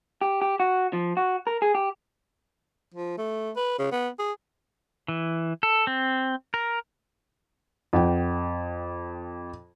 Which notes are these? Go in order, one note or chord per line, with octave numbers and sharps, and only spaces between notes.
G4
G4
F#4
F3
F#4
A#4
G#4
G4
F3
A3
B4
C#3
B3
G#4
E3
A4
C4
A#4
F2 F#5 G5